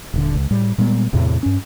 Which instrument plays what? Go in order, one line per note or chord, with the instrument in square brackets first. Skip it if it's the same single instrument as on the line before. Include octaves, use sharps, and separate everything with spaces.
[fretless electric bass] D#1 D3
C#2
A2 G3
A#2 G3 G#3 B3
E2 A2 C3
G2 C#4